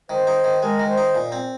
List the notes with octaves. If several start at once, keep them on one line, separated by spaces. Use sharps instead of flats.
D#3 C5
D#4
D#3
G#3 A#4
D#3
C5
D#4
A#2
C4